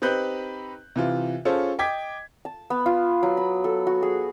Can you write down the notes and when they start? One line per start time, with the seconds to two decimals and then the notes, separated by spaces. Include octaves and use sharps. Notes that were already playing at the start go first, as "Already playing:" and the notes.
0.02 C4 D#4 G4 B4 F#6 G6
0.96 C3 E3 F4
1.45 C#4 F4 G#4 A4 C5
1.79 D#5 G5 D6 G#6 B6
2.45 A5
2.70 B3
2.86 F4
3.23 F#3
3.37 B5
3.64 A4
3.87 F#4
4.03 G#4